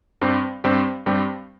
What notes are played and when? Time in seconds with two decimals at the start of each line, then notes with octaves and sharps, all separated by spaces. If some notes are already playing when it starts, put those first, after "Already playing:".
0.21 G2 G3 C4 G4
0.64 G2 G3 C4 G4
1.06 G2 G3 C4 G4